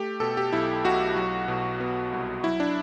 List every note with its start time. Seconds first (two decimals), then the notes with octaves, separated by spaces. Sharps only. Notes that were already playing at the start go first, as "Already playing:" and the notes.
Already playing: A3 G4
0.20 B2 A4
0.37 G4
0.52 B1 E4
0.84 B1 F#4
1.17 F#3
1.48 B2
1.80 B3
2.12 C2
2.43 F#3 E4
2.60 D4